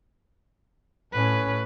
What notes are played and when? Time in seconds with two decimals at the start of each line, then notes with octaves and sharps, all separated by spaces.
1.13 A2 C#4 B4